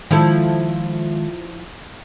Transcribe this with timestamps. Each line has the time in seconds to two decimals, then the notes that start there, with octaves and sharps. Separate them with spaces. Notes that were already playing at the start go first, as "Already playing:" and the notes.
0.11 D#3 F3 G#3 E4 A4